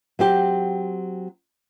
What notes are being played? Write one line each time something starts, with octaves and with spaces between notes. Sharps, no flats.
F#3 C4 G4